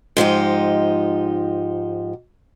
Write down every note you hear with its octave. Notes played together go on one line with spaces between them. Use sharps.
G#2 F3 D#4 G4